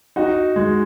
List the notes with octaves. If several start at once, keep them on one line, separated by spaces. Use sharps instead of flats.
D#4 F#4
G#3